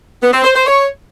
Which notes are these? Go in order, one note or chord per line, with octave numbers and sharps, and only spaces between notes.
B3
C4
C5
C5
C#5